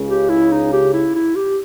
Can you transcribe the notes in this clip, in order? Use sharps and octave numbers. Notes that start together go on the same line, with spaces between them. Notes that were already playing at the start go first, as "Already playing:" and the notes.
Already playing: C#2 C#3
G4
E4
D#4
G4
E4
E4
G4